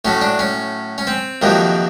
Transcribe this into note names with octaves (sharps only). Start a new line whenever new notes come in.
A2 F#3 A3 C#4
D4
C#4
C#4
C4
F2 C3 D#3 F#3 A#3